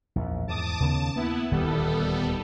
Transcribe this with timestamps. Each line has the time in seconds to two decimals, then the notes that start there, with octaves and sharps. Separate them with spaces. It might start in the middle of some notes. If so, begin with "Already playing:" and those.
0.16 A#1 E2
0.48 E2 G#2 A5 D6 D#6
0.80 D#2 C#3 B3 A5
1.16 A#3 B3 E4
1.52 D#1 D2 D#3 G3 B3 A4